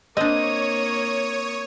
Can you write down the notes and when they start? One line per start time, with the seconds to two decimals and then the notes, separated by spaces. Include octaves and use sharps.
0.17 A#3 C4 D4 C#5 D#5 D#6